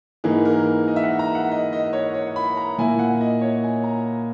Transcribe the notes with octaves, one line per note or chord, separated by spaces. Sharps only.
G#2 E3 A#3 D#4 G#4
A#4
D#5
E5
F#5
A#5
F#5
D#5
D#5
C#5
C#5
B5
A#5
A#2 A#3 E4 G#5
F#5
D#5
C#5
G#5
A#5